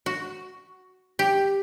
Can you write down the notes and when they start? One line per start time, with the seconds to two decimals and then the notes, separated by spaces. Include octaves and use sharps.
0.06 F#4
1.19 G4